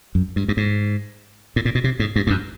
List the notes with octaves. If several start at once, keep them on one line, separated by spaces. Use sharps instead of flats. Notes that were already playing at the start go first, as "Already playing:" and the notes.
F#2
G2
G2
G#2
A2
A#2
B2
C3
G#2
G2
G2
F#2